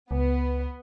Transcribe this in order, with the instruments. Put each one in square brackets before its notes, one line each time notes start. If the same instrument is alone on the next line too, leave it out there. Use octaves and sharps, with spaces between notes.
[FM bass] C#2 [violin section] B3